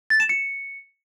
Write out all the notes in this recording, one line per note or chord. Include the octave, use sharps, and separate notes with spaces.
A6
E7
C#7